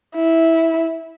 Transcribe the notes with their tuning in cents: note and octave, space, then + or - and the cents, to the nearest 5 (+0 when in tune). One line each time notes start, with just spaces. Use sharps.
E4 -10